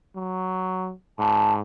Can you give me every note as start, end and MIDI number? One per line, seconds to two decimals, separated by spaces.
0.15 0.93 54
1.18 1.60 44
1.18 1.52 81